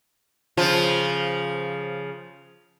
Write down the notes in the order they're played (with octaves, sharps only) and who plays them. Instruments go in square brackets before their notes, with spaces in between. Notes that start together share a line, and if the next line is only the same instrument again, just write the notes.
[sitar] C#3 F3 F4